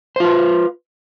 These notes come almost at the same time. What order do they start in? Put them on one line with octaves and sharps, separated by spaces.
C5 F4 B4